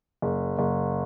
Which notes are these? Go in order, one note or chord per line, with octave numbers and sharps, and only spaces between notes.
F#1
F#1